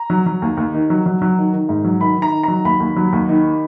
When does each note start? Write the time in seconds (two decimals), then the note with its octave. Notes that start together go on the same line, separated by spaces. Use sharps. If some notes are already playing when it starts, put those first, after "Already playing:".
Already playing: A#5
0.10 F#3
0.26 F#3
0.42 D#2
0.57 D#2
0.74 D#3
0.90 F#3
1.06 F#3
1.22 F#3
1.38 D#3
1.53 D#3
1.69 G#2
1.84 F#3
2.01 D#3 B5
2.17 D#3
2.22 A#5
2.32 D#3
2.43 F#3 A#5
2.65 D#2 B5
2.80 D#2
2.96 F#3
3.13 D#2
3.29 D#3